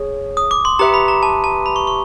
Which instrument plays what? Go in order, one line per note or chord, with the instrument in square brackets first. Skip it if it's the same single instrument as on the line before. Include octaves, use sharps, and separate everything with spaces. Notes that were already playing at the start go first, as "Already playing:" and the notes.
Already playing: [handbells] G#4 C#5
[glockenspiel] D#6
D6
C6
[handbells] G4 B4 E5 [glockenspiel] A#5
[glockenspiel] B5
A#5
A5
A5
B5
C#6
C#6